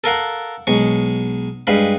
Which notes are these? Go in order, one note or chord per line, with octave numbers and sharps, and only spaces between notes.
A4 A#4 F5 F#5
B1 G#3 C#6
G2 G#3 F5 B5